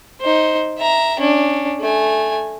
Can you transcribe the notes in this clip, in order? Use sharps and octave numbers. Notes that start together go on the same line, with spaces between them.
D#4 C5
E5 A#5
C#4 D4
A3 G#5